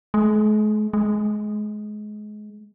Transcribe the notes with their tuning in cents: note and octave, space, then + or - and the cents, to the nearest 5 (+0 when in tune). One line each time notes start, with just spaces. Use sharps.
G#3 +45
G#3 +25